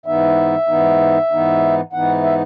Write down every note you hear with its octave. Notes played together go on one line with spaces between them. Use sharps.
G#2 E3 B3 D#4 E5
G#2 E3 B3 D#4
G#2 E3 B3 D#4
G#2 E3 B3 D#4 F#5
E5